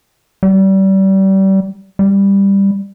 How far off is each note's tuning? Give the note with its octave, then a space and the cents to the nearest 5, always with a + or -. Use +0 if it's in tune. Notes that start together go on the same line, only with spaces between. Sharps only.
G3 -30
G3 +10